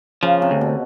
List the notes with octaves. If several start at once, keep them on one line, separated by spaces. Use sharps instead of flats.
C#3 F3
C3
D2
B2